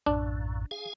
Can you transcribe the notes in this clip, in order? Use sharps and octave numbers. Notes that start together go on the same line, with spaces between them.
A#1 F#2 A2 D4
G#4 F5 G#5